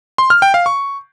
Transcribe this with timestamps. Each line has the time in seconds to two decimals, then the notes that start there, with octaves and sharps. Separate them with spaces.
0.18 C6
0.30 F6
0.42 G5
0.54 F5
0.66 C#6